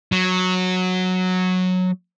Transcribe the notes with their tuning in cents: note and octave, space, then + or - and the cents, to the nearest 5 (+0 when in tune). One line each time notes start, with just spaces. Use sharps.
F#3 -10